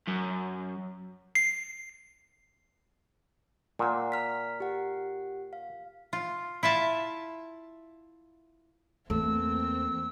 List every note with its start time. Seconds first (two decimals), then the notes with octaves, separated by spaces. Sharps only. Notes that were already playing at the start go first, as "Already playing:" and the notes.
0.07 F#2
1.35 C7
3.79 A#2 F#5 A#5
4.12 A#5 F6 B6
4.60 G4 F#5
5.53 F5
6.13 F4
6.63 E4 F4 E5 A5
9.10 E2 A3 A#3 C4 E6